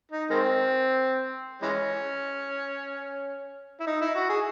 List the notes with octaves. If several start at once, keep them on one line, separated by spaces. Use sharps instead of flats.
D#4
D#3 G#3 C4
E3 G#3 C#4
E4
D#4
E4
F#4
G#4